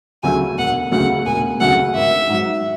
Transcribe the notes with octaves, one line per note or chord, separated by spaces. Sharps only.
D2 C#3 F#3 A3 G#5
E1 F#5
D2 C#3 F#3 A3 F#5
E1 G#5
D2 C#3 F#3 A3 F#5
G#1 E5
G#2 F#3